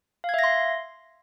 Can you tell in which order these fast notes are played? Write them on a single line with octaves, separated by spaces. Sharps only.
F5 G#6 E5 A#6 C6